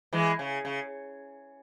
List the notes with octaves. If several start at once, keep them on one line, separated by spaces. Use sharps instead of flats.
E3 G#3
C#3
C#3